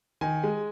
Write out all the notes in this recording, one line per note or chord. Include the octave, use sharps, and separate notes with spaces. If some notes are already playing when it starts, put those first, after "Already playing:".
D#3 G#5
G#3